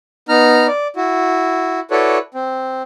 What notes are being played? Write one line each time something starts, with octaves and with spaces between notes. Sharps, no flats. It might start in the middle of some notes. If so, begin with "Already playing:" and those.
B3 D#4 A#5 F6
D5
E4 F#4
E4 F#4 A4 B4 C#5 D5
C4